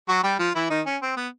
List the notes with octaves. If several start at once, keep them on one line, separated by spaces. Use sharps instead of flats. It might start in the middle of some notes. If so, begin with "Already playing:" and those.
F#3 F#4
G3 G4
F3 F4
E3 E4
D#3 D#4
C#4
C4
B3